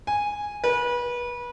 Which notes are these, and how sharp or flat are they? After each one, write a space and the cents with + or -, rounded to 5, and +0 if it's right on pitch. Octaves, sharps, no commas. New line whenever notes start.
G#5 -10
B4 -30